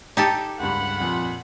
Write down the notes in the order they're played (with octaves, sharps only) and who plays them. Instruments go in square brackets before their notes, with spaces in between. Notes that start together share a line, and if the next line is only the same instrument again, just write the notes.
[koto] D#4 G4 A4 [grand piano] D6 G#6
[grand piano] C#2 G2 [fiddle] F#5 B5
[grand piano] F2 A#2